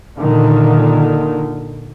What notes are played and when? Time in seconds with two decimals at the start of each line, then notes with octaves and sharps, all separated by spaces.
0.18 A#2 D3 D#3